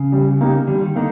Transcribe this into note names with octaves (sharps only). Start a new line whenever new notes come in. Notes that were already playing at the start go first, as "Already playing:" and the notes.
Already playing: C#3
G3
A#3 D#4 G4
D3 G3
D#3
D3 A#3 D#4